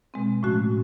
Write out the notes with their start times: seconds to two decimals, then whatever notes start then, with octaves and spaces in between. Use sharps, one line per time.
0.14 B2 G#3 C4
0.43 A2 F3 A3 C#4 F#4